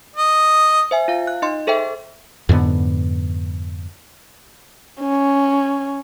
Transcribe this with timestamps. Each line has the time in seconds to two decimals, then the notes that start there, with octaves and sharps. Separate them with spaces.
0.16 D#5
0.91 C5 E5 G#5
1.08 F4 F5
1.27 F#6
1.42 D#4 D#5 C6
1.67 G#4 A4 C5 E5 G5
2.49 F2 G#2 D3 B3
5.01 C#4